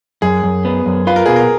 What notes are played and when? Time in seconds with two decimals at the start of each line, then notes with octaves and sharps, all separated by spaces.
0.22 F#2 G#4
0.44 F#2
0.65 B3
0.86 F#2
1.07 F4 B4
1.16 A#4
1.26 B2 G#4
1.36 A#4